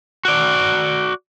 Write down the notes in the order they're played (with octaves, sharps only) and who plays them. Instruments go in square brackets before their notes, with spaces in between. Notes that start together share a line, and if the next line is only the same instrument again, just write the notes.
[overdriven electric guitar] F#4 D5